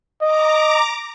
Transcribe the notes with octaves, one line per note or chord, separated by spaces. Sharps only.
D#5 A#5 D6